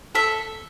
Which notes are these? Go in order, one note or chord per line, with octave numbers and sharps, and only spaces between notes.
A4 E5